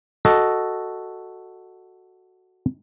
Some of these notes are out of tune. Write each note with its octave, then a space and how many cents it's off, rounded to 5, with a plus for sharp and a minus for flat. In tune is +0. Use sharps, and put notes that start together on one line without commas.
F#4 +0 A4 +0 D#5 +0